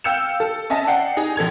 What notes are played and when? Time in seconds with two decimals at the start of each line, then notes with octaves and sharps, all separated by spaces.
0.04 F5 G5 E6 G6 C#7 E7
0.40 A4
0.70 C#4 D#5 E5 A5
0.87 D5 F#5 G5 C7
1.17 D#4 G#4
1.36 A#1 A4 G#6 F7